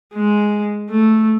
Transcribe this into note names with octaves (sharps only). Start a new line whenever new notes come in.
G#3
A3